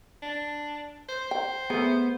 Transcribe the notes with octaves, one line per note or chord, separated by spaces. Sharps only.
D4
C5
G5
A3 B3 G#4